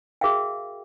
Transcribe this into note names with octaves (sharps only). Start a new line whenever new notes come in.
F#4 G#4 A#4 E5 F5 G5